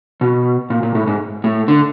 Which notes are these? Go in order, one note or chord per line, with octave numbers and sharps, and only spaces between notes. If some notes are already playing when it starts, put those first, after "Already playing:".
B2
A#2
A#2
A2
G#2
A2
D3